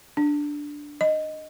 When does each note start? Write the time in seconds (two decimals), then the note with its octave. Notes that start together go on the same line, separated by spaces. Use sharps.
0.17 D4
1.01 D#5